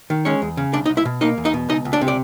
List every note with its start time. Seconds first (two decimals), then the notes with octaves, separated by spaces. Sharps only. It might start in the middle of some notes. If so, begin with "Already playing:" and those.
0.10 D#3
0.25 G#3 C#4 C#5
0.42 E2
0.57 C#3
0.74 C2 D4 D5
0.86 D#4 D#5
0.89 C2
0.97 E4 E5
1.05 B2
1.21 A#3 D#4 D#5
1.38 E2
1.45 D#4 D#5
1.54 B2
1.69 C#2 D#4 D#5
1.85 C#2
1.93 D4 D5
2.01 C3
2.08 D5